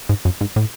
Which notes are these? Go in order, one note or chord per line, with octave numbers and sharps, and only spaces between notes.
G#2
F#2
G#2
A2